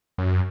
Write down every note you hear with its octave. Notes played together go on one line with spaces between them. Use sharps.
F#2